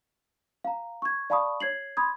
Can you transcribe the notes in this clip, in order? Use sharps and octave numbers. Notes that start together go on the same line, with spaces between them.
F5 A#5
C#6 G#6
D5 F5 A5 B5 C#6 D#6
C#5 G#6 C7 F#7
B5 C6 D#6 G#6